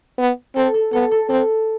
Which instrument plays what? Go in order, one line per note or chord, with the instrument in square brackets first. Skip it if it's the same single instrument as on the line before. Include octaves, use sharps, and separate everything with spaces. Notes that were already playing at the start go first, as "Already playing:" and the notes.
[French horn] B3
[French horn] C4 [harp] A4
[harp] A4
[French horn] B3 [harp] A4
[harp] A4
[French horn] C4 [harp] A4